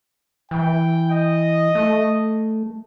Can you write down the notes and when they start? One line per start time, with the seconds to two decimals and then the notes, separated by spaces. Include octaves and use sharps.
0.51 E3 G5
1.11 D#5
1.75 A3